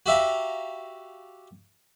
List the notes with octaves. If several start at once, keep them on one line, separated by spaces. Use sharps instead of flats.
F#4 G4 E5 F5 A#5